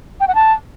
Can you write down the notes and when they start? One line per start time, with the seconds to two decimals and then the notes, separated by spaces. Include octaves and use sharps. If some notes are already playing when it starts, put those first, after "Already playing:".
0.20 G5
0.28 F#5
0.35 A5